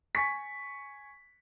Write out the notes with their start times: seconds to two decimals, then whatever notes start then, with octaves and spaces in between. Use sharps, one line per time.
0.15 G#5 C#6 B6